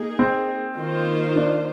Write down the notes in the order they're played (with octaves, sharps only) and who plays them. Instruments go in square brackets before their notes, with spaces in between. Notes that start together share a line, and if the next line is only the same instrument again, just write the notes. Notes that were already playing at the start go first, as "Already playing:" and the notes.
Already playing: [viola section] A#3 D#4 G#4
[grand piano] C4
[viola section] D#3 A#3 F4 C5
[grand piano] D4